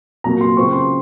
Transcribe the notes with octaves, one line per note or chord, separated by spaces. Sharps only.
C2 A#2 F#3 A#3 A#5
C6
C#3 F#3 C4 F4 C#6
C6